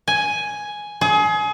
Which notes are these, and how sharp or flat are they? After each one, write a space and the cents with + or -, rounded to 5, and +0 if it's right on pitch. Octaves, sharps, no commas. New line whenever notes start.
G#5 +5
G#4 +30